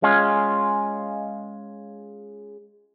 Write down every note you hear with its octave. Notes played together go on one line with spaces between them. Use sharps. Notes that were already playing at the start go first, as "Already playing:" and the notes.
G#3 C#4 F4